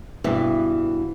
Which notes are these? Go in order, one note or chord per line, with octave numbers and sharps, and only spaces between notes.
G2 B2 E3